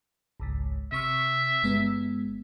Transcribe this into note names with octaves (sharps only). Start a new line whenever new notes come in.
G#1 C#2 G#2
C3 E5 C#6 F6
G1 G#3 B3